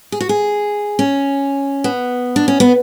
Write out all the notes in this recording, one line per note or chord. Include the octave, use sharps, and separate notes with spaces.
G#4
F#4
G#4
C#4
B3
D4
C#4
B3